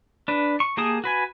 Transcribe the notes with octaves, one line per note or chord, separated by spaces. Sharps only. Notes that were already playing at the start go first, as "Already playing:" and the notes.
D4 B4
C#6
A#3 G4 G#4 A5 D#6
F#4 B4 G#5